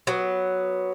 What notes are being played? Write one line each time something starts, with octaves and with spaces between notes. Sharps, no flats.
F#3 B3